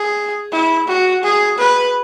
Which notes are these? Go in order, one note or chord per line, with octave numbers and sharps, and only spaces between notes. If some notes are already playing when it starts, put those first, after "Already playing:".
Already playing: G#4
E4
F#4
G#4
B4